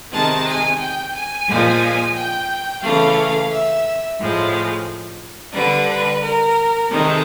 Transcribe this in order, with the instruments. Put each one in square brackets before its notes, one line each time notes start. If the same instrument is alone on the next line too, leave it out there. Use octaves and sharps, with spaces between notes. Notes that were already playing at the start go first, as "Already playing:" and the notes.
[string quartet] C3 D#3 G#3 A5
G#5
G5
G#5
A#2 F3 G#3
G5
C#3 E3 A3 F5
E5
A2 F3 G#3
D3 G3 B4
B4
A#4
C3 D#3 G#3 A4